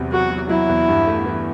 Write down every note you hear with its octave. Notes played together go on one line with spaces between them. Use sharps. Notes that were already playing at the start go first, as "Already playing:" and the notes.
Already playing: E2 C3 F#3
F#3 F#4
F#3
F#3 E4
E2
G2
A3
E3